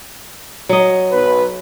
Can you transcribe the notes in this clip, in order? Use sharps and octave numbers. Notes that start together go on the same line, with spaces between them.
F#3 D#5
B1 B4